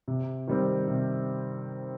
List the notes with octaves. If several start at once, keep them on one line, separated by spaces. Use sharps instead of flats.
C3
D#3 G3 C4
C3